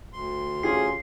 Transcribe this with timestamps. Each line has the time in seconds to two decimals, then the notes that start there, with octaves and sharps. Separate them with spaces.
0.13 D2 C6
0.63 C#4 F4 G4 G#4 C7